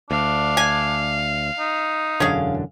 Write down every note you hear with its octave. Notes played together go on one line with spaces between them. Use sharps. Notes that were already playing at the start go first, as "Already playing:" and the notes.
D2 D4 F5
G#5
D#4
E1 F#2 D3 C#4 G#4 F5